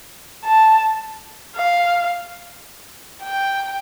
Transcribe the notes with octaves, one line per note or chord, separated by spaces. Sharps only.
A5
F5
G5